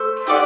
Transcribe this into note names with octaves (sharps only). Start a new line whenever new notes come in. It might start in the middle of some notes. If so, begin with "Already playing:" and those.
Already playing: A3 C5
D#4 G4 D5 F#5